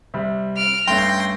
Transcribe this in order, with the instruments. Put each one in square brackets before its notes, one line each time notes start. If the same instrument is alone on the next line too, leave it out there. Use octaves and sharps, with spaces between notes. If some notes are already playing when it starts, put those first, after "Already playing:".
[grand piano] C3 G3
[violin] F6 D7
[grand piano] G2 A3 C#4 [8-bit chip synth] G5 C6 [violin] A#6